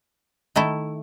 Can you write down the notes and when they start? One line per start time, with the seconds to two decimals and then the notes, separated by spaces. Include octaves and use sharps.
0.56 D#3 A3 E4